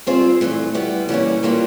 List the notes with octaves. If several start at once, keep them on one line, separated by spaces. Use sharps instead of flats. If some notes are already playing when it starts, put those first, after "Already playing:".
G3 C4 F4 G#4 C5
G2 E3 A3
G3 B3 E4
E3 G3 A#3 C#4
E3 G3 A#3 D4 F4